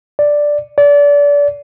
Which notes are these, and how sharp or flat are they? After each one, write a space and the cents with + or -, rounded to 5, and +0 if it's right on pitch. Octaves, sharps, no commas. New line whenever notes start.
D5 +0
D5 -30